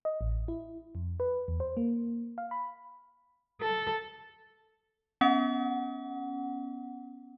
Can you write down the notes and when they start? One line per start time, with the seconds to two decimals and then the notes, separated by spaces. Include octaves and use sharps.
0.05 D#5
0.21 A1
0.48 E4
0.95 F2
1.20 B4
1.48 E2
1.60 C5
1.77 A#3
2.38 F5
2.51 B5
3.61 A4
5.21 B3 C#4 F#5